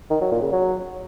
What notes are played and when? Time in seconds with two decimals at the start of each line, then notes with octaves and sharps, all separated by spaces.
0.11 D#3
0.21 F#3
0.31 A#2
0.42 C#3
0.52 F#3